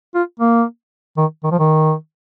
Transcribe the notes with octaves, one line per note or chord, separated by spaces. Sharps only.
F4
A#3
D#3
D#3
F3
D#3